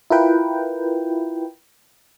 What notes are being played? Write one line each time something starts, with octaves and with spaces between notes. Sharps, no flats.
E4 F4 A#4 B4 G5